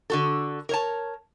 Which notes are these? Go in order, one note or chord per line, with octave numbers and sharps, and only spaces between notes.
D3 F#4 A4
A#4 C#5 A5